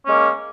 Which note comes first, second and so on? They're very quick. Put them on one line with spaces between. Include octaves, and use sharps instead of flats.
C#4 G#3 A#3